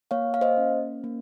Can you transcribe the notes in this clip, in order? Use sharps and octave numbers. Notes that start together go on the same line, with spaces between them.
A#3 C#5 F5
F5
C5 D#5
C#4
A#3